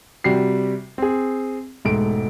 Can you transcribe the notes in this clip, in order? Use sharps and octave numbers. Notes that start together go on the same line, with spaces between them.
C3 G3 F#4 G5 C7
C4 G#4
E1 G#2 A3 D7